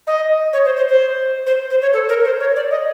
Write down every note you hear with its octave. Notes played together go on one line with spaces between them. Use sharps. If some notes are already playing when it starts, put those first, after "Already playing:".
D#5
C#5
C5
C5
C5
C5
C5
C#5
A4
A#4
C5
C#5
D5
D#5